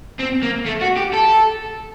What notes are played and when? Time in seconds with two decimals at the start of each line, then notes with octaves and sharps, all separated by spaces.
0.19 C4
0.43 A#3
0.66 A3
0.82 F#4
0.97 G4
1.14 A4